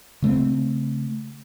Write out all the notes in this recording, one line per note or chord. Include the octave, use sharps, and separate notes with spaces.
C#3 A3 A#3 C4